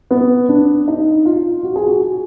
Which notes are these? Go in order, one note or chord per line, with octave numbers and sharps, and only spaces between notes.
B3
D4
D#4
F4
F#4
G#4
F#4